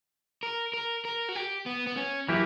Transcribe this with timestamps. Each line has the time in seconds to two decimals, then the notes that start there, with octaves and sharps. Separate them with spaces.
0.43 A#4
0.73 A#4
1.05 A#4
1.29 F#4
1.35 G4
1.66 B3
1.87 B3
1.97 C#4
2.28 E3 F#3 A#3 E4 G4